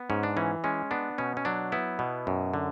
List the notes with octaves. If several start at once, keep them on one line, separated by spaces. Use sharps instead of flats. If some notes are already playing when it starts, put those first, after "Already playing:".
Already playing: B3
G#2 C#4
D4
E3 C#4
G#3 C#4
B3 D4
B2 C#4
C#4
F#3 D4
B3 E4
B2
F#2
D3